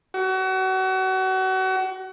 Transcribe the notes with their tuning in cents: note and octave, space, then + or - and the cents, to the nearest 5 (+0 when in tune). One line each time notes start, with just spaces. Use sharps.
F#4 +30